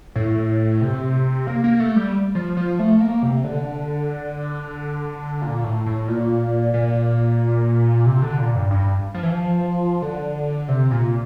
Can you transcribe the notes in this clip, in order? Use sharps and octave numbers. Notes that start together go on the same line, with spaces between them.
A2
C3
A#3
A#3
A3
G3
F3
F3
A3
A#3
C3
D3
A#2
A2
A2
A#2
A#2
C3
D3
A#2
G2
G2
F3
E3
F3
D3
C3
A#2